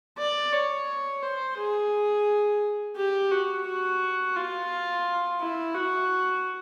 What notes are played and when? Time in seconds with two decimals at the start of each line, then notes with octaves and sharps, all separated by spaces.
0.18 D5
0.52 C#5
1.23 C5
1.57 G#4
2.96 G4
3.31 F#4
3.66 F#4
4.36 F4
5.40 E4
5.75 F#4